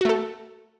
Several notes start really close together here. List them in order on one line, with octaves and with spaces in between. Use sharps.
F#4 A3 A4